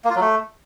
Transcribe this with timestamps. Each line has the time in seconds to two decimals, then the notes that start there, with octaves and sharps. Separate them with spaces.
0.05 A#3
0.10 F4
0.16 F#3
0.21 A3